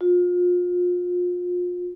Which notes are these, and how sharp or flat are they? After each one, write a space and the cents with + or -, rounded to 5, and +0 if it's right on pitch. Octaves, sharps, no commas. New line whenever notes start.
F4 +30